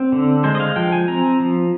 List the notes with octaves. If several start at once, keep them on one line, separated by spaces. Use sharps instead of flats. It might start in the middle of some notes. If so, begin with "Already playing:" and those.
Already playing: C4
D3
G#3 C5
D#5
F5
F3 G5
G#5
C4 A#5
F3